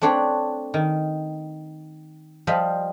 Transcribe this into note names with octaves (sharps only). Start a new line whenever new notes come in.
A3 C4 D4 C#5 F#5
D#3
F3 G3 F4 D#5 B5